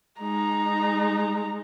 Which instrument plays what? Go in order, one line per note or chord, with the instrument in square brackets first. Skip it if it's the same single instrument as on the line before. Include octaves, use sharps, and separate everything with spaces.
[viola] G#3 D#4 [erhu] A#5